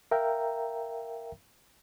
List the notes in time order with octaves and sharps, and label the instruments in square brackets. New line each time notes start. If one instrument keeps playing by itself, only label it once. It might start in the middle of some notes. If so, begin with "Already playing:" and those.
[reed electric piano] A#4 E5 F5 G5 A#5